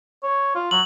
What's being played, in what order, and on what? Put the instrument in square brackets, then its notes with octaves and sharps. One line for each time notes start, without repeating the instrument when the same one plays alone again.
[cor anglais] C#5
F4
[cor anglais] F#3 [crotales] F#7